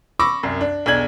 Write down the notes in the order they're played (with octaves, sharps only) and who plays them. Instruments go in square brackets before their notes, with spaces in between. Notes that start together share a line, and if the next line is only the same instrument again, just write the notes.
[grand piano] B5 C#6 D6 E6 A#6
C2 F#2
D4
B1 E2 D4 G#6 F#7